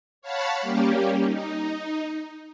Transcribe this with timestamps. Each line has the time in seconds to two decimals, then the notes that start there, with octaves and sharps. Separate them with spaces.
0.22 C#5 F5 F#5 A5 B5 C#6
0.61 G3 A#3 C#4 G4
1.24 D#4